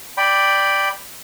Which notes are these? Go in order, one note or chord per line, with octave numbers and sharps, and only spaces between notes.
D5 G5 B5